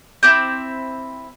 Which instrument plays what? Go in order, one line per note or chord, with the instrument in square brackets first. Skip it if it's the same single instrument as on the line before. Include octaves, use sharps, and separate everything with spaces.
[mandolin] C4 E4 D6 G6